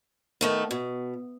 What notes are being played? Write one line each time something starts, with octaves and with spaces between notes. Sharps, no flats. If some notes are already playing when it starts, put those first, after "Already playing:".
D#3 A3 B3
B2